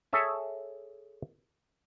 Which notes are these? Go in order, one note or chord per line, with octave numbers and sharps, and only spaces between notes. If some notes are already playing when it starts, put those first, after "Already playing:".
G#4 A4 C#5 E5 G#5